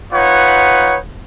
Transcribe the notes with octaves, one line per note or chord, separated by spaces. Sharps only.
D#4 F4 B4 C#5 F#5